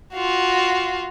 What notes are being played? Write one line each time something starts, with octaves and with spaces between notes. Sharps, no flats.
F4 F#4